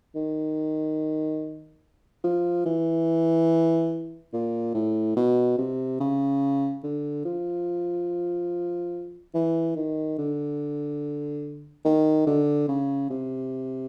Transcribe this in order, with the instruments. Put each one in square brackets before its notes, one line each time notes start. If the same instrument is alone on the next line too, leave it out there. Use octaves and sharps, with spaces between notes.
[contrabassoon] D#3
F3
E3
A#2
A2
B2
C3
C#3
D3
F3
E3
D#3
D3
D#3
D3
C#3
C3